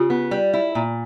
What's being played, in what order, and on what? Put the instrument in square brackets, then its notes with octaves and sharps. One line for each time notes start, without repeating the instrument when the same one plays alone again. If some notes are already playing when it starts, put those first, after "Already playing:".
Already playing: [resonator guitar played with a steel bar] C#3 [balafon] F4 G4
[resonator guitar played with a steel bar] B3
G3
E4
A#2